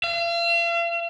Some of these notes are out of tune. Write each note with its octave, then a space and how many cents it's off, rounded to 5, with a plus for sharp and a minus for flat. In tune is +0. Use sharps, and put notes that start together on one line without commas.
F5 -45